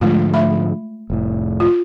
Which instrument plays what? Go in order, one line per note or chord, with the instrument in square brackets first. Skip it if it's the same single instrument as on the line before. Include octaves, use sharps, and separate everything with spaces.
[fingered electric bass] G#2 D3 F3 [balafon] G#3 A3 F4
[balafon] A3 E5 B5
[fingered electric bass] F1 A2
[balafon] F4